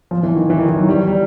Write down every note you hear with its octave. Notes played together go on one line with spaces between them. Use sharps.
F3
E3
D#3
E3
D#3
E3
F#3
G3
G3